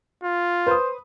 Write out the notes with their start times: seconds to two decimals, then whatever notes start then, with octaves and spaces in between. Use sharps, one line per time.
0.24 F4
0.67 B4 C5 D#6